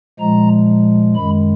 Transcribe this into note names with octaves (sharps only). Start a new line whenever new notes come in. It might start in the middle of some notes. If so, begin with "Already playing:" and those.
A#2 F3 G#3 A#5
F#2 D#3 G#3 B5